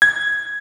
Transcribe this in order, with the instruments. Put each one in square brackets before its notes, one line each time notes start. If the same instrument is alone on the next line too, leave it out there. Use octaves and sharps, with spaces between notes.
[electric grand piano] G#6